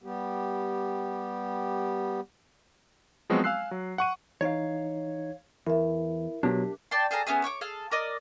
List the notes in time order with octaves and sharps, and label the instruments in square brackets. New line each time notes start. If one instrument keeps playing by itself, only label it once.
[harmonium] G3 B3 G4
[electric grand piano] F3 F#3 G#3 B3 C4 F#4
F5 G#5 E6 F#6 C7
F#3
F#5 C#6 D#7
[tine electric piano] E3 D#4 [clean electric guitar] C#5 F5
[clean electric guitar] E2 [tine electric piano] E4 [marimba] A#4 E5
[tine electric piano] B2 F#3 B3 [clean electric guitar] D4 G4
[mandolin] D5 G5 A5 C6
G#4 A4 F5 A#5
B3 C#4 E4 G#4
C#5 C#6 D6
G#4 A4 F5
A#4 D5 D#5